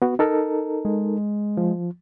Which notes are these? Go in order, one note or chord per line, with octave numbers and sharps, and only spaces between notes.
B3 F#4
D#4 A4 A#4
G#3
F3